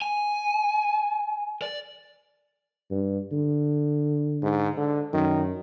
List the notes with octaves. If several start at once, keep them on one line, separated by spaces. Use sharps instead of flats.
G#5
D5
G2
D3
G#2
D3
F#2 D#3